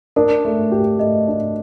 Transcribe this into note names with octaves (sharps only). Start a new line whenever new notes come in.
D4 A#4
A3
G4
A3 D#5
D4